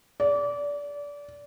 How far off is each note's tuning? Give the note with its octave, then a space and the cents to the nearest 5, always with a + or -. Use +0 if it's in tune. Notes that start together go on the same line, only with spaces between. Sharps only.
D5 -25